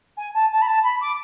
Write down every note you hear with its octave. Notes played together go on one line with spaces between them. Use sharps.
G#5
A5
A5
B5
A5
B5
D6